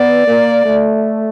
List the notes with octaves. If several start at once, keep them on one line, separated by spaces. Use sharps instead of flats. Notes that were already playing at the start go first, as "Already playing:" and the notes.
Already playing: B3 D5
A#3
A3